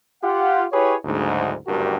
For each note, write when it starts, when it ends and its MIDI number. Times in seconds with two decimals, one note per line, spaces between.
0.22 0.65 65
0.22 0.65 67
0.22 0.65 78
0.72 0.95 64
0.72 0.95 67
0.72 0.95 68
0.72 0.95 71
0.72 0.95 73
1.05 1.55 30
1.05 1.55 38
1.05 1.55 44
1.67 1.97 30
1.67 1.97 38
1.67 1.97 43
1.67 1.97 66
1.67 1.97 67
1.67 1.97 70